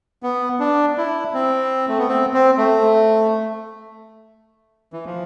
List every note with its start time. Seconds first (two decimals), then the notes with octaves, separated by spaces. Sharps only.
0.23 B3
0.60 D4
0.98 E4
1.34 C4
1.88 A3
1.98 B3
2.08 C4
2.34 C4
2.58 A3
4.93 E3
5.06 F3